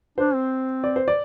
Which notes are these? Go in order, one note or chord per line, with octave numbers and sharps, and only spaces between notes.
D4 C5
C4
D5
C5
D5